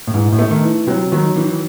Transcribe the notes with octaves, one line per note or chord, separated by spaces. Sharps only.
A2
G#2 E3
A2
A3
D#3
E3
C3 F#3
D#3 F#3
D#3 E3
E3